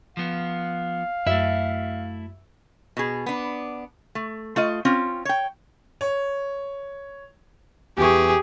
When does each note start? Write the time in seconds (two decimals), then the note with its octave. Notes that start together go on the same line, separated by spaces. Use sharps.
0.17 F3 B3 F5
1.26 F#2 A3 E4 E5
2.97 B2 G#4
3.26 B3 D4
4.15 A3
4.56 A3 F4 D#5
4.85 C4 C#4 F4
5.25 C#5 G5
6.01 C#5
7.97 E2 E3 G4 G#4 C#6